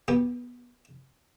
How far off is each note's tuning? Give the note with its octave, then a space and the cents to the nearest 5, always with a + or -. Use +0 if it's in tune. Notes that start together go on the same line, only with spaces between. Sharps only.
B3 -15 G4 +0